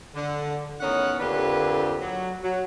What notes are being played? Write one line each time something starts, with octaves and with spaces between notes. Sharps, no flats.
D3
E2 A2 D#3 C#4 D#4 F#5
F2 D3 A#3 D4 G4 B4
F#3
F#3